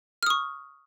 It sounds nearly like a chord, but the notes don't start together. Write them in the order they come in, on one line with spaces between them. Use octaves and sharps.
F6 D#6 C#6